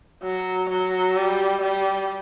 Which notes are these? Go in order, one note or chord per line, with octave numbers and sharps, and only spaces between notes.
F#3
F#3
G3
G3